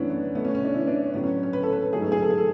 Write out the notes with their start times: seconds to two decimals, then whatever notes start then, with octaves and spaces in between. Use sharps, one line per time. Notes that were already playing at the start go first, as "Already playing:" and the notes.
Already playing: F#2 E3 A3 B3 C#4 D4 E4
0.10 B3
0.35 B2 A3 B3
0.45 C#4
0.55 C#4
0.65 D4
0.74 E4
0.87 D4
1.14 A2 F#3 A3 B3
1.24 C#4
1.43 C#4
1.53 B4
1.63 A4
1.73 B4
1.83 A4
1.93 G#2 F#3 A3 G#4
2.02 A4
2.12 G#4
2.23 A4
2.30 G#4
2.38 A4